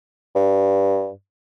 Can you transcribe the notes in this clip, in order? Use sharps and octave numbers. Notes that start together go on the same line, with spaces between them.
G2